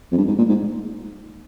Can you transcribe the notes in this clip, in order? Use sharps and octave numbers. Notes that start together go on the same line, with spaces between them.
F2
G2
G#2
A#2
G#2